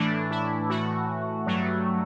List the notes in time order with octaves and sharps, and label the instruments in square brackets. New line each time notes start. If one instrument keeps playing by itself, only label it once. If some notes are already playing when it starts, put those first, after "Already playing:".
Already playing: [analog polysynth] A2 E3 A3 D4
E4
A2 E3 A3 F#4
G2 F#3 A3